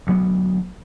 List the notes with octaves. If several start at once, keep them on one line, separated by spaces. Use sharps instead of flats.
D2 F#3 B3